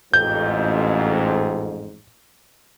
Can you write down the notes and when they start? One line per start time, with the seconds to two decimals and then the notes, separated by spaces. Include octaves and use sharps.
0.14 A1 F2 G#2 G6